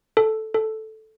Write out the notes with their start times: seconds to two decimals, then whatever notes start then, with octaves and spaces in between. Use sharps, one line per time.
0.17 A4
0.54 A4